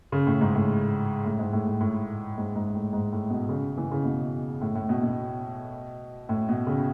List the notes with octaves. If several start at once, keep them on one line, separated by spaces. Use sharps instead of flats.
C#3
A2
G#2
A2
A2
G#2
A2
A2
A2
G#2
G#2
A2
G#2
A2
B2
C#3
E3
C#3
B2
A2
A2
B2
B2
A2
B2
C#3